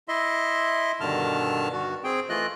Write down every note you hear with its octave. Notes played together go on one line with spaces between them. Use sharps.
E4 D#5 E5 C6
G2 B2 D3 D#3 A5 F6
G2 F#4
C4 G#4 G5
E3 A3 F4 D#5 F#6